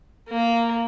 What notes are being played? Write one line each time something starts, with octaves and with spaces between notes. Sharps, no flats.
A#3